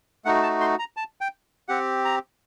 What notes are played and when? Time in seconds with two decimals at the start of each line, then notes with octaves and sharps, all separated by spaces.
0.25 A3 D#4 F#4 F#5
0.43 A5
0.61 C6
0.79 A#5
0.97 A5
1.21 G5
1.68 C4 G4 F#5
2.05 A#5